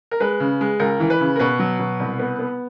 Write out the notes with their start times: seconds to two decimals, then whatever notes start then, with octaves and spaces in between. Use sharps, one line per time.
0.11 A#4
0.20 G#3 B4
0.40 C#3
0.61 G#3
0.80 C#2 A#4
1.00 E3
1.10 B4
1.20 C#3
1.36 A#4
1.40 B2 B4
1.59 F#3
1.79 B2
2.00 C2
2.19 B3
2.39 B3